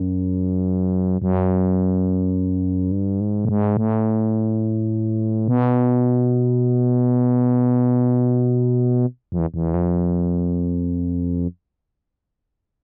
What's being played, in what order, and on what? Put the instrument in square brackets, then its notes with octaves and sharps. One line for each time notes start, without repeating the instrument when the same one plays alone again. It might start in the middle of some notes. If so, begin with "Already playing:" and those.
Already playing: [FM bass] F#2
F#2
G2
G#2
A2
G#2
A2
B2
F2
E2
E2
F2